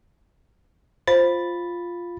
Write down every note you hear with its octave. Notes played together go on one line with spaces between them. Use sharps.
F4 C5 B5 A6